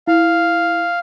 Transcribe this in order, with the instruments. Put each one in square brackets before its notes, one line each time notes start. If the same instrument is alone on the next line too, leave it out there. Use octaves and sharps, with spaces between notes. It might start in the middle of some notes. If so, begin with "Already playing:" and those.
[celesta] E4 [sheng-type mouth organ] F5